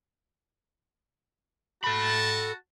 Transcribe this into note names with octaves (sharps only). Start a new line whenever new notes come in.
F#4 A4 A5 B5